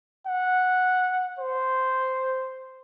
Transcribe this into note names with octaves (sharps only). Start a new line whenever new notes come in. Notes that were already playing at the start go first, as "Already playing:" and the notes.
F#5
C5